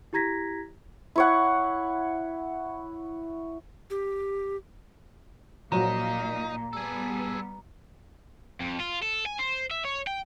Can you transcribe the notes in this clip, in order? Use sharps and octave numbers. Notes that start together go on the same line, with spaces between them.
E4 G4 A#5 G#6 A#6 B6
E4 C#5 F#5
G4
A#2 F3 F#3 D#4 A#5
G3 B3 G#4 A4
F2
F4
A4
G#5
C5
E5
C#5
G5